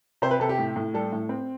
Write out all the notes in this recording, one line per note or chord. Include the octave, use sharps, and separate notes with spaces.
C3 C5
B4
C3 A4
G4
A2
A2
G3 A4
A2
C4